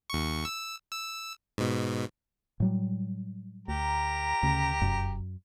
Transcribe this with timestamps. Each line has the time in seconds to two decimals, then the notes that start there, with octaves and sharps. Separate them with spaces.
0.10 D#2 C#6
0.45 E6
0.92 E6
1.58 G#2 B2
2.60 A2 F#3 G3
3.68 D2 G4 A#4 A#5
4.43 D2 C#3
4.82 F1 F#2